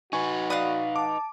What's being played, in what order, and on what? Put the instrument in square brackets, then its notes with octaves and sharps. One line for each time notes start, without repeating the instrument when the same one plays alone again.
[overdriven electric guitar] D#4 B4 [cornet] F#4 [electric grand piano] G#5 C#6
[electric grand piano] D5 B5 [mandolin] F5 F#5 D#6
[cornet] A5 [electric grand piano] D6